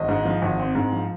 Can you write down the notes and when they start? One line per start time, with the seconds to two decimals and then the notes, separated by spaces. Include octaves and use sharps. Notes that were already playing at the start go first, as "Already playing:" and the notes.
Already playing: G#1 D#5
0.09 G#2
0.25 F3
0.42 G#1
0.59 C4
0.75 G#2
0.93 F3